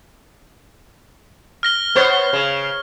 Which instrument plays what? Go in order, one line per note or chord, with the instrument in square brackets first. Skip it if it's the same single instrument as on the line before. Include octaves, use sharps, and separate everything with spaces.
[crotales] F6 A#6 G7
[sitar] B3 C5 C#5
C#3